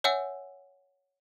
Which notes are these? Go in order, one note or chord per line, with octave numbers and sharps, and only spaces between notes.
C#5 E5 F#5 G#5 E6